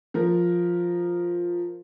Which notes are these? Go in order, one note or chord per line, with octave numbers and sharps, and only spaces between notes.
F3 A#4